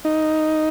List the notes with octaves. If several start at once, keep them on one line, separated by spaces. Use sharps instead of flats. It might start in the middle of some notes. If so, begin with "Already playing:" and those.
D#4